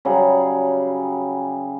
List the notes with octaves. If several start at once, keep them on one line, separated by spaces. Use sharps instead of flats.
C#3 F#3 G3 G#4